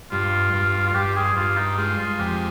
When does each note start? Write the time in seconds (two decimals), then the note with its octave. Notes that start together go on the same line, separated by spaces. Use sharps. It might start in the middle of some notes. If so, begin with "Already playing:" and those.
0.12 G2 F4
0.53 G2
0.87 F4
0.95 G2 G4
1.16 G#4
1.36 G2 F4
1.57 D#4
1.78 G#3 F4
1.99 F4
2.19 F2 G4